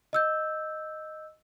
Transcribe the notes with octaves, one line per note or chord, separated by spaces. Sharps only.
D#5 E6 G6